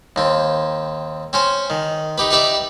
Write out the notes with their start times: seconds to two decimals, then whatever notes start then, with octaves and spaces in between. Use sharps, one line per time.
0.16 D#2 C4
1.33 C4 C#4 C5
1.70 D#3
2.18 D#4 G4 B4
2.31 D#4 G4 B4 D5 E5